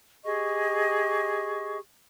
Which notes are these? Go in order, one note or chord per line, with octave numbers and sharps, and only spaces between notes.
G4 G#4 D#5 C#6